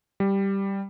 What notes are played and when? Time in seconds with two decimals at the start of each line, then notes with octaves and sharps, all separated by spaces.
0.20 G3